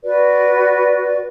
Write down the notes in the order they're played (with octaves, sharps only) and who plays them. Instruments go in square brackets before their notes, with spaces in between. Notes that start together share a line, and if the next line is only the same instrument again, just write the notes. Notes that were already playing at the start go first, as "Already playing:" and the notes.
[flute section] F#4 B4 D5